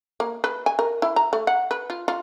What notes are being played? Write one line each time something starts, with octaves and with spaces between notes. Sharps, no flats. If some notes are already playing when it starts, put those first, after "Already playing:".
A#3
B4
G#5
A#4
E4
A#5
A3
F#5
B4
F4
F4